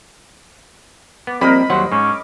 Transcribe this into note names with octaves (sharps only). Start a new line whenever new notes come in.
B3 D6
F3 G3 A#3 C4 A#4 D#5 B5
D#2 F#3 G3 C5 F#5
G#2 C#4 D6